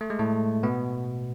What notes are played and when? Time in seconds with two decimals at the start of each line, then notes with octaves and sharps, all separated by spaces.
0.01 A3
0.10 G#3
0.19 A2 A3
0.63 B2 B3